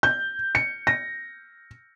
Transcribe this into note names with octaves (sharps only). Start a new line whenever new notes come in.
G6
C#7
A#6